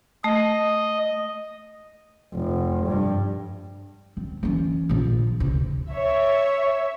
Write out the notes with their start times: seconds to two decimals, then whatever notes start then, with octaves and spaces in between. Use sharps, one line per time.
0.24 A3 D#5
2.33 F1
2.87 G2
4.17 C4
4.43 E3 C#4
4.89 A#1 F3
5.40 D2 C3
5.90 C#5 E5